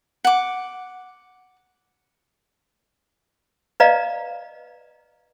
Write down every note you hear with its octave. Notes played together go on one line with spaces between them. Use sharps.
F#5 D6
B4 D5 D#5 F5 A#5